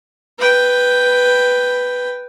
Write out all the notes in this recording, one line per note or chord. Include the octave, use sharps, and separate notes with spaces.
B4 G5